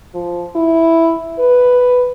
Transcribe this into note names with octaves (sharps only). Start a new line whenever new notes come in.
F3
E4
B4